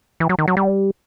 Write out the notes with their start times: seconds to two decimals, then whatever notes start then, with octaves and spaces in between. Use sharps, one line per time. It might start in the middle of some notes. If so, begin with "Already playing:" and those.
0.20 E3
0.29 F#3
0.39 D#3
0.48 F#3
0.57 G3